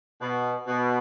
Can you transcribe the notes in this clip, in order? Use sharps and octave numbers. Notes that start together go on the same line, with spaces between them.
B2
B2